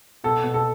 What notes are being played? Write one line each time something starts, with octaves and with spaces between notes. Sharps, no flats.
B2 A4
B2
A4